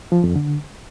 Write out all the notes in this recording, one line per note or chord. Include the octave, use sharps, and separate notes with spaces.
F3
F2
D3